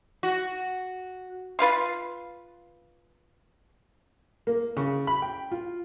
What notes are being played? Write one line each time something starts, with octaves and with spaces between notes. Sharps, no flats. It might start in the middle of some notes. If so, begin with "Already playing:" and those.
F#4
F4 B4 F5 C6
A#3
C#3
B5
G5
F4